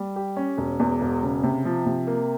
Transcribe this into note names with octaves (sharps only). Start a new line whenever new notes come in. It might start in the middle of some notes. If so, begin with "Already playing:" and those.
Already playing: G3
G4
C#4
E1
E2
E1
C#3
C3
F3
C3
A#3